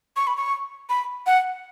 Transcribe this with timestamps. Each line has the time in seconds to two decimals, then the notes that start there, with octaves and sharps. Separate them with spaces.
0.16 C#6
0.27 B5
0.37 C#6
0.89 B5
1.27 F#5